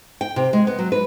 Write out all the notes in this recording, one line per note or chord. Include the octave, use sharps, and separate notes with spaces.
G5
C3
G#3
B3
F#3
B4